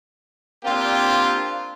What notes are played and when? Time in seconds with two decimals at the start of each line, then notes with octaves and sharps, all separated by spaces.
0.64 A#3 C4 D4 F4 G4